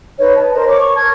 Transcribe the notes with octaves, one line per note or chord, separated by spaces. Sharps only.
D#4 B4 C#5 D#5
A5
A#4 C5 D#5
C#5 D6
C#6
A#4 A5 C#6 G#6